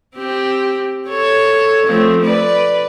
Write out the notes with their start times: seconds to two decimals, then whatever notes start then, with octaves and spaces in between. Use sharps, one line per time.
0.16 C4 G4
1.08 A4 C#5
1.86 F3 A3 C4
2.23 B4 D5